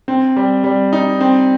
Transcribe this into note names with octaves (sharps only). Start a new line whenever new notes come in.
C4
G3
G3
D#4
C4